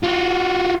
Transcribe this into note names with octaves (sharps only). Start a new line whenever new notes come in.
F4 F#4